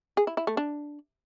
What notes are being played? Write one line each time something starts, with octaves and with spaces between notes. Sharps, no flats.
G#4
E4
E4
A3
D4